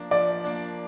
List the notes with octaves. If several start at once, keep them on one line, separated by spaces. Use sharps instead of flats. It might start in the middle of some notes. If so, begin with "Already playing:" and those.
Already playing: F3 A#3 D4
F3 D5
A#3 D4